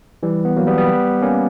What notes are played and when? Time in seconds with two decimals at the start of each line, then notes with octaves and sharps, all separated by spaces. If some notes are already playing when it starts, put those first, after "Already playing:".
0.23 E3 G3
0.45 B3
0.56 F#3 A#3
0.67 G3 B3
0.78 G3 B3
1.22 A#3 C#4